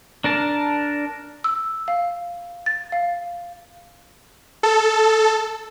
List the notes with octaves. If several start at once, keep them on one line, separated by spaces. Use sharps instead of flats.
D4 A#4 A5
E6
F5
A6
F5
A4